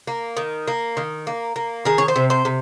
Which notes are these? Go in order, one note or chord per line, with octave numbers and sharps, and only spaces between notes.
A#3
D#3
A#3
D#3
A#3
A#3
D#3 G#4
C#5
C5
C3
C5
C3